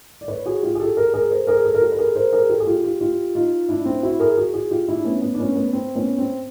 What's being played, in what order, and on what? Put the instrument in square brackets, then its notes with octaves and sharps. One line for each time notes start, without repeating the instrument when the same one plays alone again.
[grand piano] D5
B4 C#5
F#4 G#4
F4 G4
G#4
G4 A4
G#4 A#4
G#4 A#4
A#4 C5
G#4 A#4
A4 B4
A#4
G4 A4
B4
G#4 A#4
A#4 C5
G#4 A#4
G4 A4
G#4
F4 G4
F4 G4
F4 G4
D#4 F4
D4 E4
C4
E4 F#4
G#4 A#4
F#4 G#4
F#4 G#4
F4 G4
D4 E4
B3 C#4
B3
D4
B3 C#4
B3
C4
B3 C#4
C4